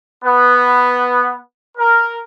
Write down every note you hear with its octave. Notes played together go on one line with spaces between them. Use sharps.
B3
A#4